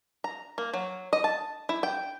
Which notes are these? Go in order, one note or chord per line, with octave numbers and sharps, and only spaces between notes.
A#5
A#3
F#3
D#5
A5
E4
G5